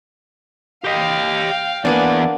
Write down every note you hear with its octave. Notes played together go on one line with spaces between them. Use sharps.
G4 D#5 F5 G5
E2 A#3 B3 D4 D5 G#5